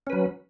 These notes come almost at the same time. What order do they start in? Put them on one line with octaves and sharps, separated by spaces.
C#4 B4 F#3